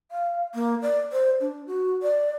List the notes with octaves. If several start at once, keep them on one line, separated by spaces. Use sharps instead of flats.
F5
A#3
D5
C5
D4
F#4
D5